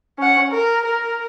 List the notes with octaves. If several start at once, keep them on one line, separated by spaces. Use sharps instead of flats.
C#4 F#5
A#4
A#4